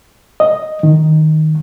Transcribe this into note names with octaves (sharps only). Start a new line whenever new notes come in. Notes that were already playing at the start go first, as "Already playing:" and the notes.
D#5
D#3